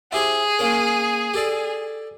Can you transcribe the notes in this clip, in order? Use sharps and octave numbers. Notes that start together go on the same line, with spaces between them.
E4 G4 G#4 C5
A#3 C#4 A#4
G4 A4 D5